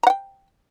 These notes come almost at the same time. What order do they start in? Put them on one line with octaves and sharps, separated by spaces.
A#5 F#5 G5